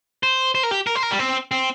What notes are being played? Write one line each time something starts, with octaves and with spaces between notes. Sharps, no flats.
C5
C5
A#4
G4
A#4
C5
A#4
G3
C4
C4